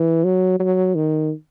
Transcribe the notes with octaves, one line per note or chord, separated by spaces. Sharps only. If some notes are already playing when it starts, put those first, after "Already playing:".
Already playing: E3
F#3
F#3
D#3